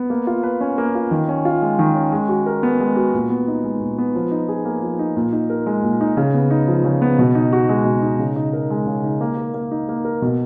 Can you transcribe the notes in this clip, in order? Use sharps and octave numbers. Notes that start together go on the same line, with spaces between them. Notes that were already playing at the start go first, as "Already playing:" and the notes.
Already playing: B3
A#3
F4
B4
C#4
A#3
F4
D#3
C#4
F4
G#3
D#3
C#4
G#3
F#4
A#4
B3
G#3
F#4
A#2
B3
D#4
G#3
A#2
B3
F3
D#4
G#4
A#3
F3
D#4
A#2
D#4
A#4
G#3
A#2
D#4
C#3
B3
D#4
F3
C#3
B3
B2
D#4
F#4
G#3
B2
D#4
C#3
D#4
A#4
G#3
C#3
D#4
A#3
A#4
A#3
D#4
A#3
A#4
B2